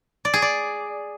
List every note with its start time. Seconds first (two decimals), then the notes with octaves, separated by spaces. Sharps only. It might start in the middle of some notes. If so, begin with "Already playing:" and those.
0.25 D5
0.34 G#4
0.42 D5